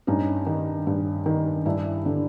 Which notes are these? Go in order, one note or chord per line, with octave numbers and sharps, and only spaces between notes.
G2 C#4 D#4
D#3
G2
D#3
G2 D4 E4
D3